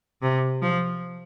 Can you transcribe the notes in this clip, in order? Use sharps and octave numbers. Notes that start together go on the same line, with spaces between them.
C3
F3